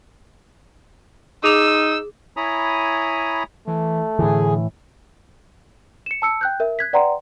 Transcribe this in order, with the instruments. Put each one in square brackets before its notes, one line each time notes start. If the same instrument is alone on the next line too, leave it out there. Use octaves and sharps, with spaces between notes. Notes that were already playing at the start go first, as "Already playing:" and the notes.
[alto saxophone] D#4 [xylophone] G#4 D6 F7 [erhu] E6
[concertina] E4 C#5 G#5 A#5 B5 D#6
[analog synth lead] E3 [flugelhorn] A3
[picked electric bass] A2 E3 [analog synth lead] D3 [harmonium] G#4
[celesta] C#7 E7
A5 E6 C#7
G5 F#6 G6
A#4 E5
F#6 G#6 B6
B4 D5 F#5 G5 A#5 C6